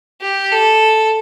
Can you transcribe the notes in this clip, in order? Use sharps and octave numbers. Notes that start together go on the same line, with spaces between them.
G4
A4